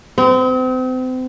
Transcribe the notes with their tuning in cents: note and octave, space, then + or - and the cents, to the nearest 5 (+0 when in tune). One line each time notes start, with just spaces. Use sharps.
C4 -35